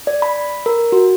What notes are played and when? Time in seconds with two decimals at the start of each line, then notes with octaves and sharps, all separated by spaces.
0.07 D5
0.22 B5
0.66 A#4
0.92 F#4